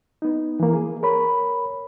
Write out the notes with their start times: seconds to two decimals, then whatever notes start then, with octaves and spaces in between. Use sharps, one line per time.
0.22 B3 D#4
0.60 E3 A#3
0.73 G#4
1.03 A#4 C#5 B5